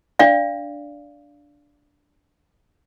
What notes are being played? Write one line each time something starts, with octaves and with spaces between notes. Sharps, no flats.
D4 D5 F5